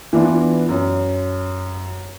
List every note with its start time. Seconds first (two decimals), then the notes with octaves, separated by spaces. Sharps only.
0.13 E3 B3 D4 F4
0.69 F#2